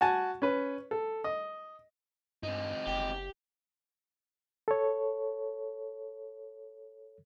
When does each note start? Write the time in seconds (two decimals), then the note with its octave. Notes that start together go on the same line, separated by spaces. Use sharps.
0.01 F#4 G#5 A5
0.42 C#4 B4
0.91 A4
1.24 D#5
2.43 G2 C4 D#4
2.87 F#1 G4
4.68 A4 C#5